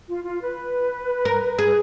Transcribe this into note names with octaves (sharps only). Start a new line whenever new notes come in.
F4
F4
B4
A#4
G#4